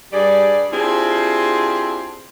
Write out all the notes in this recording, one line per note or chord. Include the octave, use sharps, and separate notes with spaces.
G2 G3 G#4 D5
C4 D4 E4 F4 G4 G#4